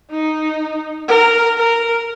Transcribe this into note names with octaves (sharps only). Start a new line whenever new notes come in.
D#4
A#4
A#4